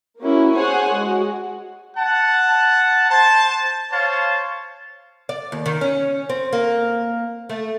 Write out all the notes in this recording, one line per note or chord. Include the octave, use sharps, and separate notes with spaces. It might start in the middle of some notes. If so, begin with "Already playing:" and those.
A#3 C#4 E4 F#4
G#4 C5 C#5 F#5 G#5
G#3 F#4
F#5 A5
C5 A5
C5 C#5 F5 A5
D5
D#2
D#3
C#4
C4
A#3
A3